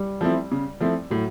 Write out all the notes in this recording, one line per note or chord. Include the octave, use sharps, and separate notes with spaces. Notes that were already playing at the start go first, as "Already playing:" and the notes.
Already playing: G3
F3 A3 C4 E4
C#3
F3 A3 C4 E4
A2 F#3